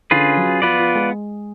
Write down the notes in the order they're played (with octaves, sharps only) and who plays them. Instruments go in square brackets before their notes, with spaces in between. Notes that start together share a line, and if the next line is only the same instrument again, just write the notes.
[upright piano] D3 [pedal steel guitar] C#4 F4 G#4 B4
[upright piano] F#3
[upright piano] F3 [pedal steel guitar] B3 F4 B4 D5
[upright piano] F3
G#3